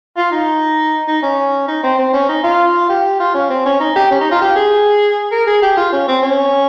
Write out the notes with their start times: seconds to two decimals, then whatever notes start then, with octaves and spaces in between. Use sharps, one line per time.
0.17 F4
0.31 D#4
1.08 D#4
1.22 C#4
1.68 D#4
1.83 C4
1.99 C4
2.13 C#4
2.29 D#4
2.44 F4
2.89 G4
3.20 F4
3.34 C#4
3.50 C4
3.65 C#4
3.80 D#4
3.96 G4
4.11 C#4
4.21 D#4
4.31 F4
4.41 G4
4.56 G#4
5.32 A#4
5.47 G#4
5.62 G4
5.77 F4
5.92 C#4
6.08 C4
6.23 C#4